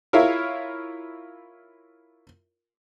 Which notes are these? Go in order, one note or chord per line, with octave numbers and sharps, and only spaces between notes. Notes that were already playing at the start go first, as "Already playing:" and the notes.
E4 F4 A#4 C#5 E5 F5